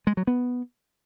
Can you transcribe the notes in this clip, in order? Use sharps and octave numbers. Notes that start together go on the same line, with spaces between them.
G#3
F#3
B3